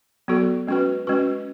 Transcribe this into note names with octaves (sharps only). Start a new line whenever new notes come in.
F#3 B3 F#4 A4
G#3 C#4 F#4 B4
G#3 C#4 F#4 B4